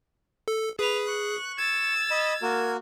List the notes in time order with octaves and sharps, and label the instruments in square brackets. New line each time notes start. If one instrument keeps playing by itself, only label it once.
[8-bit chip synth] A4
[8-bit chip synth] G#4 [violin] B4 F7
[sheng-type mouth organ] C#6 [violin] F#6
[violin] E6 A6 [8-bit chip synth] G#6
[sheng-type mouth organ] D#5 B5
A#3 F#4 A#4